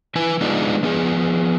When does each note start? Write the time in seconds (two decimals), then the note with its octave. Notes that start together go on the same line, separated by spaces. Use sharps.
0.15 E3 E4 B4 G#5
0.41 G#3 B3 D4 D#4 F4 G#4
0.83 F3 B3 G#4